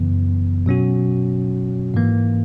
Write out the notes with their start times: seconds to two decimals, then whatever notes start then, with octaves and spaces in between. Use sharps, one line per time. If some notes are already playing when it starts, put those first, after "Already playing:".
Already playing: F#2 C#3 E3 B3
0.66 B2 F#3 C#4 F#4
1.94 G#2 E3 A#3